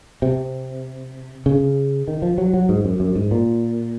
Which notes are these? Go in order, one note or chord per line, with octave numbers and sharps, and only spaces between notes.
C3
C#3
D#3
F3
F#3
F#3
G#2
F#2
F#2
G#2
A#2